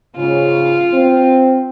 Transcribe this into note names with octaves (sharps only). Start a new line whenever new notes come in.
G#2 C#3 F4
C4